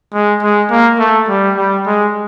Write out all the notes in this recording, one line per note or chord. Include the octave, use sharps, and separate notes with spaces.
G#3
G#3
A#3
A3
G3
G3
G#3